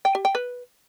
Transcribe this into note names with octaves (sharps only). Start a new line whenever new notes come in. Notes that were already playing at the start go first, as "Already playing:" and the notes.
G5
G4
G5
B4